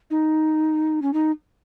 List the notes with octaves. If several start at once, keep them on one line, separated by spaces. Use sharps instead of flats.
D#4
C#4
D#4